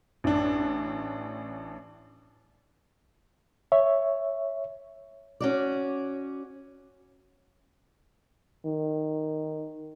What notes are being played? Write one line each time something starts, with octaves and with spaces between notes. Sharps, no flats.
A1 D4
C#5 E5
C#4 F#4 D5
D#3